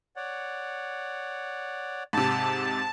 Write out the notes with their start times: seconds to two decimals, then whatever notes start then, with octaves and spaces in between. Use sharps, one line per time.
0.16 C#5 D5 F#5
2.13 G#2 C3 A5